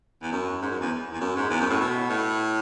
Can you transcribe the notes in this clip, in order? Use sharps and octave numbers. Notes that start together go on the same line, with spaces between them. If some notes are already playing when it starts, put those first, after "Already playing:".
E2
F#2
G#2
F#2
E2
E2
F#2
G#2
E2
F#2
A2
B2
A2